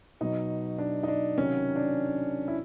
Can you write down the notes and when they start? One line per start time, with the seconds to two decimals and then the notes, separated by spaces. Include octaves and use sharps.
0.21 B2 F#3 D#4
0.78 D4
1.03 D#4
1.08 D4
1.37 C3 D#3 F#3 C#4
1.76 D4
2.48 E4